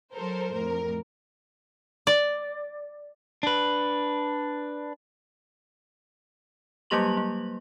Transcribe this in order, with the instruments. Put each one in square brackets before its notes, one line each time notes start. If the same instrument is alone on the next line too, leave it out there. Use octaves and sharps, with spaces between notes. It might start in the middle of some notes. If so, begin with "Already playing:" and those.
[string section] F#3 A4 A#4 C5
F2 A2 A#4
[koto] D5
[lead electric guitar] D4 B4
[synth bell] F#3 G3 A#3 G4 C6 F#7
A#3